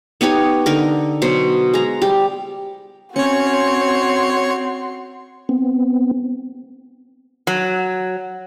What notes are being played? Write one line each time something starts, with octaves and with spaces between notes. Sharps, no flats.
B3 D#4 G4 C#5
D3 D#4 A#4
B2 F#3 C5
G#3 A#5
G3 G4
C4 C#4 F#4 C#5 C6 C#7
B3 C4
F#3